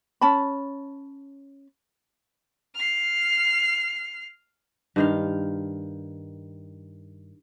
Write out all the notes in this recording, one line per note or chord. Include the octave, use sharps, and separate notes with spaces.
C#4 A5 B5
F6 C7
G2 D#3 F5